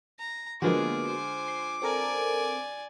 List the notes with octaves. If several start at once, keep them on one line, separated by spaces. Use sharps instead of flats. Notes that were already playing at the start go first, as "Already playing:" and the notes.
A#5
D3 F3 G#3 A#3 B3 F#4 G#4 D6
C5 G#5
C6
C4 A4 A#4 D5 G#5